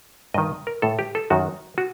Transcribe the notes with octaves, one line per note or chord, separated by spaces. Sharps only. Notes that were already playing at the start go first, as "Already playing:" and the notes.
G2 D#3 D#5
A#4
A2 A4
G4
A4
F#2 D#3 F#4
F#4